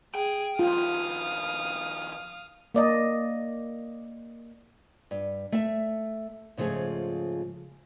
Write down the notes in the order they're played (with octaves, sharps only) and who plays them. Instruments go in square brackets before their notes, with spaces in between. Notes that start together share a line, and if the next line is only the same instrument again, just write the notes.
[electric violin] G#4 [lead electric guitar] G5
[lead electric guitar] D#3 F3 [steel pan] F4 [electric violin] F5 D#6
[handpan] A#3 D5 D#5
[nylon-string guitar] G2
A3 E5
G#2 C#3 F3 A3 G#4